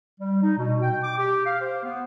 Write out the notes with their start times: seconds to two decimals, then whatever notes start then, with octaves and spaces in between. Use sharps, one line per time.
0.20 G3
0.43 D#4
0.58 B2
0.82 G5
1.03 D6
1.19 G4
1.46 F5
1.61 C5
1.84 B3